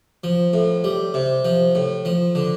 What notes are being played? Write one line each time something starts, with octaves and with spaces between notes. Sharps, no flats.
F3
A2
G3
C3
F3
A2
F3
D3